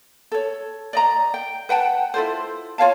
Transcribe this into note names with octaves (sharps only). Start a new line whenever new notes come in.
A4 C#5
D5 D#5 A#5
G5
B4 F#5 G5 A5
E4 F4 A4 C5
F4 C#5 F5 A5